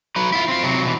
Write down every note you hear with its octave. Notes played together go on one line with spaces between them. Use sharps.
F#3 B4
E4 F4
C4 F4
C3 F#3
B2 E3